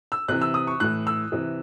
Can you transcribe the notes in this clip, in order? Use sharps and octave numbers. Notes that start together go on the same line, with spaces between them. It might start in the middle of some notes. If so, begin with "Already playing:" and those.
E6
C3 E3 F#6
E6
D#6
C#6
A2 E3 F#6
E6
C3 E3